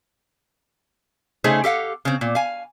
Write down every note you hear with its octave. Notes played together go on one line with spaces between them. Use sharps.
C#3 A3 D#4 G#4 C5
G4 A4 F5 F#5
C#3 C4
A#2
F5 G#5